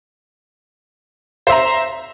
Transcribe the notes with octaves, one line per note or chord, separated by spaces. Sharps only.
C5 E5 A#5